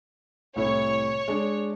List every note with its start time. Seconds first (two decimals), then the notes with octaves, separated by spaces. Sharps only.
0.56 C2 A2 E4 C#5
1.28 G#3 D4